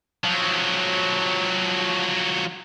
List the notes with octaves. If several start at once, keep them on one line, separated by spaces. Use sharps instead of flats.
F3 F#3